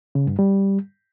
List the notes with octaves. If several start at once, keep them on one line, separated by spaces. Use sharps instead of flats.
C#3
G2
G3